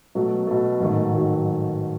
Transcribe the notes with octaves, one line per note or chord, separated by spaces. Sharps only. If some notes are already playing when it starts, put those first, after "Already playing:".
B2 F#3 A3
B2 F#3 A3
A1 G#2 D#3 F#3 A3
D#3 F#3 A3